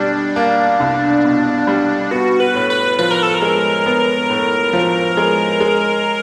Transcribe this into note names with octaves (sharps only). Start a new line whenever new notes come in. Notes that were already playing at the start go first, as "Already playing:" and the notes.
Already playing: B2 G3 D4
A#3
C2
B2
G3
B3 F#4
B4
A2
B4
F3 B4
A#4
A4
A#4
G#3
B3
A2
F3
G#3
G#3